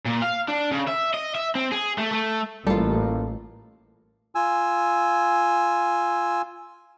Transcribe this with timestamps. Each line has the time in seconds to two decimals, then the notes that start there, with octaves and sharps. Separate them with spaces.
0.06 A#2
0.22 F5
0.48 D4
0.72 C#3
0.88 E5
1.14 D#5
1.35 E5
1.55 C4
1.72 G#4
1.98 A3
2.12 A3
2.67 A1 G3 A#3 F4 A4
4.35 F4 G#5 E6